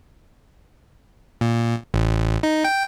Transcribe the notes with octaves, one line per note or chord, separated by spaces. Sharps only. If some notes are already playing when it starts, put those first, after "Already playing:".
A#2
A1
D#4
G5